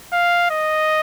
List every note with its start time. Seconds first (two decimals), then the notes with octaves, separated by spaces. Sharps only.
0.13 F5
0.51 D#5